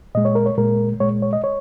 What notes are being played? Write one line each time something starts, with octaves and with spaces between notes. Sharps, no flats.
A#2 G#3 D#5
C#5
A#4
C#5
A#2 G#3 A#4
A#2 G#3 C#5
C#5
D#5
C#5